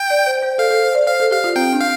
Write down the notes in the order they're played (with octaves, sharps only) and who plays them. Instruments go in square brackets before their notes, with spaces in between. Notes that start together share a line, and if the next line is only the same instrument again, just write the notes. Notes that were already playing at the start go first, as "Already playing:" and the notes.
Already playing: [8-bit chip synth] G5
[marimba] D5
C5
C5
[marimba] A4 [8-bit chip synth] F5
[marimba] A4
C5
D5
[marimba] C5 [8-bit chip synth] F5
[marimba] A4
[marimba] G4 [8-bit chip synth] F5
[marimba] F4
[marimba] C4 [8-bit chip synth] G5
[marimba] D4
[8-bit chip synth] F5